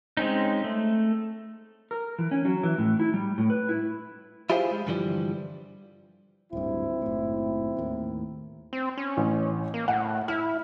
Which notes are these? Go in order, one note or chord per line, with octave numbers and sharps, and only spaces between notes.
G#3 C4 C#4 D#4
A3
A#4
E3
C#4
F#3
E3
A2
E4
G3
A2
B4
E4
E4 F4 G4 G#4 C5 F5
G#3
G2 D3 E3 F3 G3
D1 G#1 G2 C4 E4
F#1 A2
D#2 A2
C4
C#4
A1
A#3
A2 F#5
E4 F6